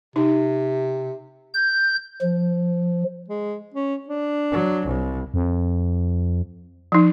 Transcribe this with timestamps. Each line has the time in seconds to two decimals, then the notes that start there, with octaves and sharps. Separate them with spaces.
0.16 C3 D#4
1.54 G6
2.21 F3
3.28 G#3
3.74 C#4
4.08 D4
4.52 F#3
4.86 C2
5.34 F2
6.92 F3 D#4